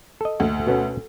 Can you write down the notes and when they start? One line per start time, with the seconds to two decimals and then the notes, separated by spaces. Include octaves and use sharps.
0.21 A4 D#5
0.40 D2
0.67 B2 B3 C#4